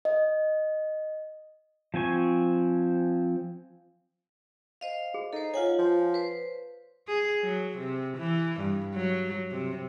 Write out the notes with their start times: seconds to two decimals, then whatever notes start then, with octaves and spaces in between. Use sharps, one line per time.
0.05 D#5
1.94 F3 C4 G#5 C#6
4.81 C5 D#5 F5
5.14 G#4
5.33 D#4 A4 C5
5.54 F4 C#5 F5 F#5 G#5
5.78 F3
6.14 B4 C5
7.08 G#4
7.42 F#3
7.78 C3
8.17 E3
8.60 G2
8.94 F#3
9.51 C3